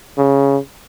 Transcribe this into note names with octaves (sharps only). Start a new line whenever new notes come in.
C#3